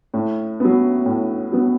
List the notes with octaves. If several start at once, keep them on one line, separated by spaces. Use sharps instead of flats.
A2
F#3 B3
A2
F#3 B3